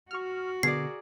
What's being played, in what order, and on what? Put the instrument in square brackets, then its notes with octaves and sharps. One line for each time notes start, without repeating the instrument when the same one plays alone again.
[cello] F#4 [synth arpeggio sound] C#6 F6
[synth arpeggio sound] B2 D3 [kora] G#4 A#4 D5 [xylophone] C7